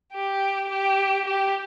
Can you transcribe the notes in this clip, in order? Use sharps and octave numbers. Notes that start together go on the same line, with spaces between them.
G4
G4
G4